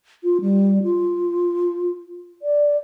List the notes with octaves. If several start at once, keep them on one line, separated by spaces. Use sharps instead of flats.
F4
G3
F4
D5